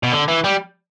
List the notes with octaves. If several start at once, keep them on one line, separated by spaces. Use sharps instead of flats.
B2
D3
E3
G3